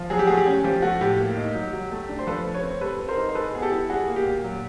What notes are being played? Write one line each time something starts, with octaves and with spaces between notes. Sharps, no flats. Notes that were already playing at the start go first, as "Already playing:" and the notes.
Already playing: F3
F#3 G#4
G4
A3 F#4 G#4
G4
C#4
F3 G4
A3 F#4
A2 G4
A#3
D#4
F#3
F#3
A3
D4
C5
F3 A4 B4
A3
B4 C#5
C4
G3 A4 B4
C4
A#4 C5
D#4
C5
G#3 A4 B4
B3 G#4
G4 A4
E4
G3 F#4 G#4
A#3
G4
A#2
F#3